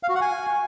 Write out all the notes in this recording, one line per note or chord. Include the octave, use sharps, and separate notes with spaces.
F5
F#4
F#5
G#5